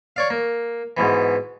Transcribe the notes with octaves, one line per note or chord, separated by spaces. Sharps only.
C#5 D5 F5
A#3
G#2 B2 E3